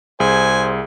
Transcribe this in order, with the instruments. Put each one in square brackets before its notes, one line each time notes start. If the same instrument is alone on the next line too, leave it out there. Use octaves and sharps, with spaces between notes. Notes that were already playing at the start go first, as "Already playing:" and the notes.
[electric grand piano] C2 G#4 [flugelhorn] C5 [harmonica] G#5